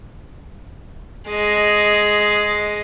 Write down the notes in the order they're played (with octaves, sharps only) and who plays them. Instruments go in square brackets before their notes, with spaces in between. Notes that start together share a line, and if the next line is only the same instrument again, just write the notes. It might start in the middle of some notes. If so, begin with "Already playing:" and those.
[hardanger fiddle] G#3 D#5